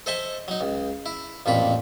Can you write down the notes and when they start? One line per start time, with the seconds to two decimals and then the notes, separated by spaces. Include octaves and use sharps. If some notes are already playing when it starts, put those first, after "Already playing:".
0.06 A4 C5 D#5 E5 G#5 A5
0.48 F#3 D#4
0.61 C#2
1.06 E4
1.46 A1 F2 A#2 F4 B5